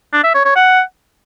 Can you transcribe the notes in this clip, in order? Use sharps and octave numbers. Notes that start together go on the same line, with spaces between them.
D4
E5
C#5
C#5
F#5